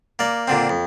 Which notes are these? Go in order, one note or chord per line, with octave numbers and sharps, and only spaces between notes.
A#3 D5
A#2 D3 C4
F2